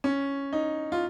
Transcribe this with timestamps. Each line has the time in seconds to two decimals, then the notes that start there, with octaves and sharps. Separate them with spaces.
0.04 C#4
0.53 D#4
0.92 F4